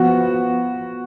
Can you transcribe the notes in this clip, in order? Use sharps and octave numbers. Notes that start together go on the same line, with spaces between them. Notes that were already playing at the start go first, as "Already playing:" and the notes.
Already playing: F3 B3 F#4